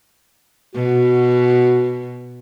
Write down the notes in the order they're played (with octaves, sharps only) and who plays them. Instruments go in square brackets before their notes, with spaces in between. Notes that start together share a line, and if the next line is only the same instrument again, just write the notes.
[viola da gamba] B2 [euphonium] F#4